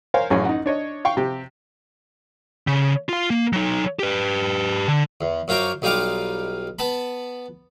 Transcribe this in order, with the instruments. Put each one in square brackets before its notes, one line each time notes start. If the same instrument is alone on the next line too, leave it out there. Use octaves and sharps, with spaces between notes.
[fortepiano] A#4 C5 C#5 F5 G#5
A1 F#2 C#4 G#4
D#4 F#5
D4 C#5 D#5
F5 G5 C#6
C3 G4
[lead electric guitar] C#3
F4 F5
A#3
F#3 D#4
G4 B4
D3
[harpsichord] E2
F#2 F4 C5 C#5 A#5 D6
B1 G3 D#4 F4 F5 D6
B3 A5 B5